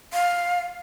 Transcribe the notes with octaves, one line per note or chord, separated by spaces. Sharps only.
F5